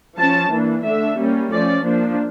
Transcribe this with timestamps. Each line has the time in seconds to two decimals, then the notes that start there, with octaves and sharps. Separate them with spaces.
0.18 F3 C#4 A5
0.51 E3 A#3 D4
0.84 D3 A3 D4 E5
1.19 G3 A#3 C#4
1.51 F3 A3 C#4 D5
1.85 F3 A#3 D4